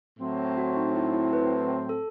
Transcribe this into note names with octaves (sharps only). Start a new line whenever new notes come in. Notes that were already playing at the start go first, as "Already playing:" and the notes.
A2 F#3 C4
F#4
D#4
E4
E4
B4
A4